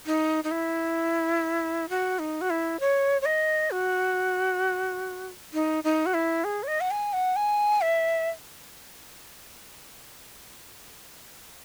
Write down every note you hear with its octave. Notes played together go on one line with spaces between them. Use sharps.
D#4
D#4
E4
F#4
D#4
F#4
E4
C#5
C#5
D#5
F#4
D#4
D#4
F#4
E4
G#4
C#5
D#5
F#5
G#5
F#5
G#5
E5